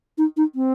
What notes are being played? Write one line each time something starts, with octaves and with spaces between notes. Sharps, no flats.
D#4
D#4
C4